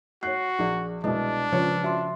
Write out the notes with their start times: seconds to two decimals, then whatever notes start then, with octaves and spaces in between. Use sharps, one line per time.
0.23 F#4 C#5 F#6 C7
0.59 A#1 G#4 D5
1.04 C2 B2 G#3 D4 B4 D#5
1.52 C#3 F3 B4 C#5
1.84 F#4 E5 C6